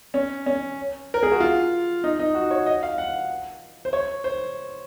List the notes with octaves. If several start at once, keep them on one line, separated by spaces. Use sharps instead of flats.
C#4
C#4
A#4
G#4
F#4
F4
D#4
D#4
F#4
C#5
D#5
F5
F#5
C5
C#5
C5